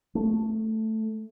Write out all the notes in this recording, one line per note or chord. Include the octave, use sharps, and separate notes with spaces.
A3